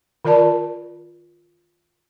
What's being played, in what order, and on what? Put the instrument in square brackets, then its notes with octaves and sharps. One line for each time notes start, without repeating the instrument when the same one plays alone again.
[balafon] D#3 F4 A#4 D5 A5